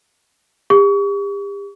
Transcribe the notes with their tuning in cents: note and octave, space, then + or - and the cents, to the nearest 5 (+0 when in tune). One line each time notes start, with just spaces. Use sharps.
G4 +40 C#6 +35